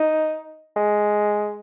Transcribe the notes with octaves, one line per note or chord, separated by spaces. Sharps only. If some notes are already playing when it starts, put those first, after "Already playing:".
Already playing: D#4
G#3